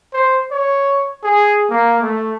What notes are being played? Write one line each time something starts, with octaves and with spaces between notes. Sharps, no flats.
C5
C#5
G#4
A#3
A3